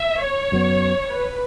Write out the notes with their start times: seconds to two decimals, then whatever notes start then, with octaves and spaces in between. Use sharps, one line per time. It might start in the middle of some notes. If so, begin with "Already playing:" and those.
Already playing: E5
0.23 C#5
0.52 F#2 F#3 B3
1.10 B4